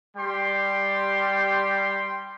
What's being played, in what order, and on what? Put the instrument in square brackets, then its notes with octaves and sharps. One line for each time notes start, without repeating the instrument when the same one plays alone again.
[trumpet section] G3 G4 G5 C6